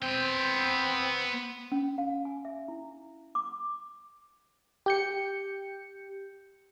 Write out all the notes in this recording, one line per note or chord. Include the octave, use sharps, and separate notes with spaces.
B3 C4 G5
C#4
F5
G#5
E5
E4
D6
G4 G6 C#7